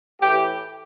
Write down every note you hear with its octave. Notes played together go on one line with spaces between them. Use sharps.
A2 E3 G4